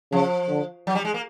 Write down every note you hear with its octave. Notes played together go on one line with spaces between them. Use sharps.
C#3 F3
D3
F#3
G3
G#3
A#3